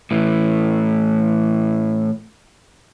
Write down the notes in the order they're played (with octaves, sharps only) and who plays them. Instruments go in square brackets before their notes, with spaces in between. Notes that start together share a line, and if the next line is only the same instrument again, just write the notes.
[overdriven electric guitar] A2 E3